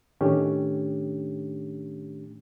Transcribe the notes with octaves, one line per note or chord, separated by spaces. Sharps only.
A2 D#3 A3 C#4 D4 G4